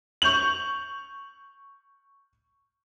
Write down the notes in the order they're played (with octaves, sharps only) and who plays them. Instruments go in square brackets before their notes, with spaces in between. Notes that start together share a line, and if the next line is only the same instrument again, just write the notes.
[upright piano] C#6 G6 F7 F#7